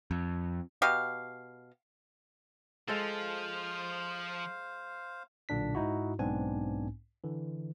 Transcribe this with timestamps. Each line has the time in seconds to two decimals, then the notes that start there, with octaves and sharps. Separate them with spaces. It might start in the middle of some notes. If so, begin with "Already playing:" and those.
0.11 F2
0.82 B2 G4 F5
2.88 F3 G#3 A4 C5 F5
5.49 B1 A#2 D3 D4 B6
5.75 G#2 D#4 E4 F#4
6.19 B1 G#2 B3 C4 D4 G#5
7.24 D3 E3